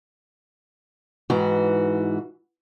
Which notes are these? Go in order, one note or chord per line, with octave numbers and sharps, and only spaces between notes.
G#2 E3 F#4